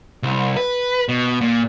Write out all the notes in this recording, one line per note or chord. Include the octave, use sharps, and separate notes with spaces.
C2
B4
B2
A#2